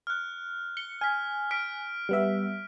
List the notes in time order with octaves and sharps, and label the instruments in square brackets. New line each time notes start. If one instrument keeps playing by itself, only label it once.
[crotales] F6 F#6
[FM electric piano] C#7 [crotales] G7
[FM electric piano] G#5 [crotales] F6 B6
[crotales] F6 B6 D7
[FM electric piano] G3 B3 E5